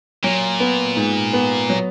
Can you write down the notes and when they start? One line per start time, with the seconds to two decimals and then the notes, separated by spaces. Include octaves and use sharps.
0.24 A#2 F#3
0.60 B3
0.97 G#2
1.33 B3
1.70 F#3